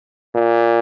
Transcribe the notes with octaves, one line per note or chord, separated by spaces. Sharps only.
A#2